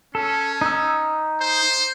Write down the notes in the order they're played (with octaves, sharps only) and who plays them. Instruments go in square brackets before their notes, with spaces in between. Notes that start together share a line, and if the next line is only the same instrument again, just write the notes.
[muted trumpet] C#4 [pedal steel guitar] A4
[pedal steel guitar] D#4 E6
[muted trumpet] C5